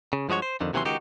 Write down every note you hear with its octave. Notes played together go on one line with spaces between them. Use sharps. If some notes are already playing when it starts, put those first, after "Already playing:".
C#3
G2 F3 G#3 F#4 C#5
C5
F2 D3 D#3
D#2 C3 E3 F#3 C#4 C6
C#2 D#3 D#4 F#4 G4